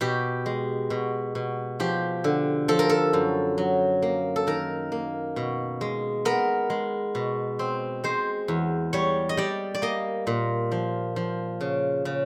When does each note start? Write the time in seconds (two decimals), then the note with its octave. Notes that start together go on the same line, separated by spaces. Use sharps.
0.01 B2 G4
0.46 G#3
0.90 B2
1.35 B2
1.80 F3 G4
2.24 D3
2.68 F3 A4
2.79 A#4
2.89 A4
3.13 F#2
3.58 F#3
4.02 A#3
4.36 A4
4.47 D#3 A#4
4.92 A#3
5.36 B2
5.81 G#3
6.25 B3 A#4
6.70 G#3
7.15 B2
7.59 C4
8.04 G#3 C5
8.48 E2
8.93 G3 C#5
9.29 D#5
9.37 G3 D5
9.75 D5
9.82 A#3 D#5
10.27 A#2
10.72 F3
11.16 F3
11.61 C#3
12.05 C#3